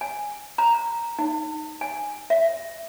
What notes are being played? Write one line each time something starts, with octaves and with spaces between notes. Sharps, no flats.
G#5
A#5
D#4
G#5
E5